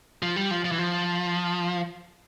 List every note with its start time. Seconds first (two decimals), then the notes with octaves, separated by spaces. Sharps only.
0.22 F3
0.36 G3
0.51 F3
0.65 F3
0.72 E3
0.78 F3